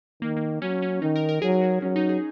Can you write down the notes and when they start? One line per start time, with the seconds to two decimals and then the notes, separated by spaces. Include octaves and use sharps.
0.22 D#3 A#3
0.37 A#3
0.62 F#3 C#4
0.82 C#4
1.02 D#3 D#4
1.16 A#4
1.29 A#4
1.42 F#3 G#4
1.61 F#4
1.82 F#3 C#4
1.96 D#4
2.09 G#4